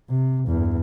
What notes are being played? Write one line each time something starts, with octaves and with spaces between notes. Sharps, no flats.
C3
E2 G2